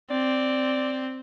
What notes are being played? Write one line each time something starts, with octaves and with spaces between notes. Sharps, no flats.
C4 D5